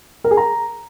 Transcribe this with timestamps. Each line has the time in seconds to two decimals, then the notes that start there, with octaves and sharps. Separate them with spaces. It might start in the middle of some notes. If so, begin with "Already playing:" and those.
0.24 A#4
0.31 G#4
0.37 A#5